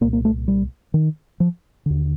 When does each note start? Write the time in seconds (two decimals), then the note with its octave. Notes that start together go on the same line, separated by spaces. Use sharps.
0.01 A#2 A#3
0.04 C2
0.13 A#3
0.25 A3
0.48 G3
0.94 D#3
1.40 F3
1.86 D#2 D3